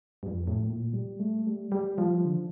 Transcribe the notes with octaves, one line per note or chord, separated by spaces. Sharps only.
G2
F2
A2
A#2
G3
A3
G3
G3
F3
D3